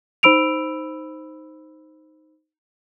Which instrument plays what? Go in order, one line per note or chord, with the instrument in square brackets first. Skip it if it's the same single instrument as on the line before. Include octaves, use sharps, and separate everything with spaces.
[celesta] D#4 C5 B5 E6 D7 F7